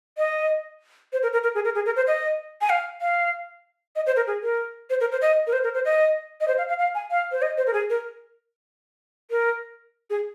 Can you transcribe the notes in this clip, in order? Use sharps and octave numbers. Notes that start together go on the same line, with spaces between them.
D#5
C5
A#4
A#4
A#4
G#4
A#4
G#4
A#4
C5
D#5
G#5
F5
F5
D#5
C5
A#4
G#4
A#4
C5
A#4
C5
D#5
A#4
C5
A#4
C5
D#5
D#5
C5
F5
F5
F5
G#5
F5
C5
D#5
C5
A#4
G#4
A#4
A#4
G#4